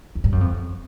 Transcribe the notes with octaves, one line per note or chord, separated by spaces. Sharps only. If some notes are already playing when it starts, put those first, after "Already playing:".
E2
G2
F#2
F2